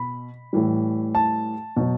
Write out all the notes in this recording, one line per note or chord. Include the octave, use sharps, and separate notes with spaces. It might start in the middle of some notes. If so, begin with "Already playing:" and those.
Already playing: B2 B5
A2 E3 G3
A5
B2 F#3